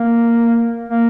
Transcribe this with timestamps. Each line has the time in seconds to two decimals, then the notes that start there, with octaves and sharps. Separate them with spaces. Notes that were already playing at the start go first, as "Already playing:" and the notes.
Already playing: A#3
0.88 A#3